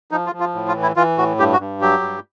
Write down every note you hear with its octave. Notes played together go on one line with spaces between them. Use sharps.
F3 D#4
F4
F3
F4
A2
F4
E3
E4
E3 F4
A2 F#4
G2 G4
F#4
G2
F#3 G4
G2